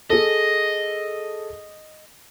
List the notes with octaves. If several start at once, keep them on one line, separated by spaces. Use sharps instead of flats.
G#4 A4 D#5